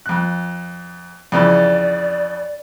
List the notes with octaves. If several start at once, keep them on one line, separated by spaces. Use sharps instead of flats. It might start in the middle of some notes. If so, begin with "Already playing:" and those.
F2 F#6
F2 C#3 E3 D5